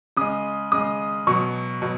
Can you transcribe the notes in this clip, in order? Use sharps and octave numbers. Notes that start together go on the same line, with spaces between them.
C#3 G#3 D#6
C#3 G#3 D#6
B2 F#3 C#6
B2 F#3